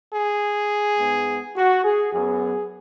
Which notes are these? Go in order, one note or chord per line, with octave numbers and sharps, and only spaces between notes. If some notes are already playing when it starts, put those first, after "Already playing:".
G#4
G#2 G#3 B3
F#4
G#4
F#2 F#3 B3 G#4